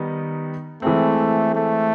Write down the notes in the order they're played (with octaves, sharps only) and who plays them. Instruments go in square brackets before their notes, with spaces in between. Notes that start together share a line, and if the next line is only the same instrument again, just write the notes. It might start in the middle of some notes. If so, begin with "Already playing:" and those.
Already playing: [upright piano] D#3 G3 B3 D#4
[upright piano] E3 G#3 C4 [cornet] A3
[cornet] A3